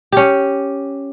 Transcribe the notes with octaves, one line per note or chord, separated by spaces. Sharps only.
C#4 G4